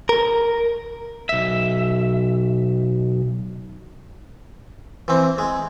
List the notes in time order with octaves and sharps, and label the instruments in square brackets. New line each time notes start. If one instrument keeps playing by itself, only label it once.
[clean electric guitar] A#4
[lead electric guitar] B1 E5
[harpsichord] E3 C4
G#3